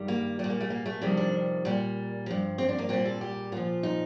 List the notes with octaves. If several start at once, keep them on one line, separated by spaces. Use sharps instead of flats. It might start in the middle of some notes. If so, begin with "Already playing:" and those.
Already playing: G2 D#3 G3
A#3
A#2 G3 A3
A#3
A3
A#3
A3
F2 C3 D#3 G3
D4
A#2 G3
G2 F3
C4
D4
A#3
A#2 G3 C4
A4
G4
A#2 F3 F4
D#4